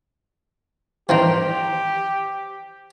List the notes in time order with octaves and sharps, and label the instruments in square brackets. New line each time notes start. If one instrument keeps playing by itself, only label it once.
[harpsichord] D#3 E3 D4 [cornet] G4 [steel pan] C5 G5 A#5